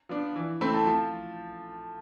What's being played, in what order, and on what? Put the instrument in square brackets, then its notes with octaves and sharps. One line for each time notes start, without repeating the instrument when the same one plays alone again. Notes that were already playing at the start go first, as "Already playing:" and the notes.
[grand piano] F3 B3 D4
E3
[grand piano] A3 C4 E4 [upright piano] B5
[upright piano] A5
[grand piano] F3 [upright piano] A5